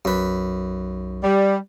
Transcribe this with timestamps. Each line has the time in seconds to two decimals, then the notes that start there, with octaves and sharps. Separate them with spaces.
0.05 B1 F#2 B4
1.24 G3